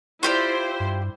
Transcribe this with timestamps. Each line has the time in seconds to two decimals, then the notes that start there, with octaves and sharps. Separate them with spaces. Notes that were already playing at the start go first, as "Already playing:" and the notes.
0.23 E4 F4 G4 C5 D5
0.80 G2